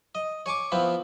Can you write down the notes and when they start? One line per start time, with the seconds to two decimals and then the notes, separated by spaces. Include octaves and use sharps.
0.15 D#5
0.46 C#5 G#5 C#6 D6
0.72 F3 B3 C4 E4